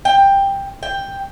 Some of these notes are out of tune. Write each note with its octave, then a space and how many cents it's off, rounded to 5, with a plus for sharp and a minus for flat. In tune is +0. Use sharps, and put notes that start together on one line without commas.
G5 +10
G5 +5